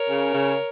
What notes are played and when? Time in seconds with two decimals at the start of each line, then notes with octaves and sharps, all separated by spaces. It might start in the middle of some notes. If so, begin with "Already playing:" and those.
Already playing: A#4 C#5
0.08 C#3
0.34 C#3